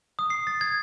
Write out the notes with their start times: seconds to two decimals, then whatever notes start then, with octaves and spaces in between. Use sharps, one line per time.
0.19 D#6
0.30 C7
0.47 A6
0.61 G#6